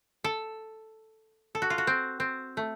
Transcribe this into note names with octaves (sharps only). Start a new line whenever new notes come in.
A4
A4
F#4
F4
F#4
C4
C4
A3